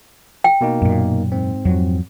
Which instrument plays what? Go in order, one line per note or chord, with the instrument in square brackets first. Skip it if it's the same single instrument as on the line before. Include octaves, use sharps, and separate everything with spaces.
[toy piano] G5
[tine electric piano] B2 A#3 D#4
[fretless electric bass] F#2 A#2
[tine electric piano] G#2 C4
[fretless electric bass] F2 F#3